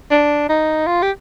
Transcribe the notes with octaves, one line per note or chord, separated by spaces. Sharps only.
D4
D#4
F4
G4